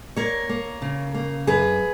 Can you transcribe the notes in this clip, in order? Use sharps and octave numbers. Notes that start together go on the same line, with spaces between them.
A#3 A#4 C#5
A#3
C#3
A#3
F#2 G#4 B4